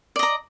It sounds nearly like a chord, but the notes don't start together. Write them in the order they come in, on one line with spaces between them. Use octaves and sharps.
D5 D#5 A#5